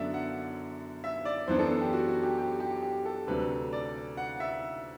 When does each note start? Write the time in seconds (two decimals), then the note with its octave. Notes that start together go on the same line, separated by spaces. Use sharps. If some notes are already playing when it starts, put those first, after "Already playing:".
Already playing: F#2 D3 F#3 B3 D4 D5 E5
0.14 F#5
1.04 E5
1.25 D5
1.48 F#2 E3 B3 D4 C5
1.59 A4
1.71 A4
1.82 G4
1.93 F#4
2.08 F#4
2.23 G4
2.38 G4
2.60 G4
2.83 G4
3.05 A4
3.27 D2 C3 F#3 A3 D4 B4
3.73 D5
4.17 F#5
4.40 E5